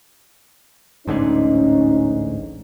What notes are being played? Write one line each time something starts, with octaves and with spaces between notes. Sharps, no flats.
A1 D2 G#2 C#4 D#4